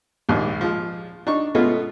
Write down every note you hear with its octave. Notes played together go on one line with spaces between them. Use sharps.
A#1 D#2 G#2
F3 G#3
D4 D#4 C#6
B2 G#3 A3 B3 C#4 F4